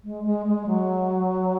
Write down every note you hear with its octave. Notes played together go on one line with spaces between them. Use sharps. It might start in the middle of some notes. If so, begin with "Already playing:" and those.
G#3
G#3
G#3
F#3